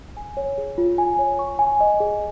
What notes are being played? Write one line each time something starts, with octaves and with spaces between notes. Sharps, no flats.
G#5
C#5
G#4
F4
G#5
C#5
C#6
G#5
D#5
G#4